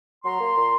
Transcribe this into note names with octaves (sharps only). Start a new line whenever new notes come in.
F#3 A#5 C6
A#3
A#2